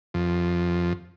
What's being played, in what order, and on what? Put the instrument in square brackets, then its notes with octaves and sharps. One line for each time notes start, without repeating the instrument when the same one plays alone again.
[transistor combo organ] F2